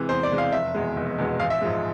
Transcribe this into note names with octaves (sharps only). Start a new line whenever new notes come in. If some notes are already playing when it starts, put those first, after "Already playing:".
Already playing: C3 E3 G#3
E2 C5
D5
C3 E3 G#3
F5
F1 E5
E2 B2 G#3
F1
E2 B2 G#3
A1 F5
E5
G#2 F3 G#3